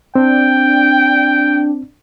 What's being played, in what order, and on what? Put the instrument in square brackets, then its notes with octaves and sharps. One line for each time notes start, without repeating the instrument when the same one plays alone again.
[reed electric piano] C4 [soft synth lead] D4 [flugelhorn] G5